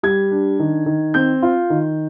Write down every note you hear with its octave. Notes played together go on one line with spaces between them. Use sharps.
G3 G#6
D4
D#3
D#3
C4 G6
F4
D#3